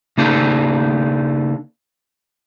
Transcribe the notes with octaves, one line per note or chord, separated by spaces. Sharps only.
C#3 A#3 D4 D#4 A4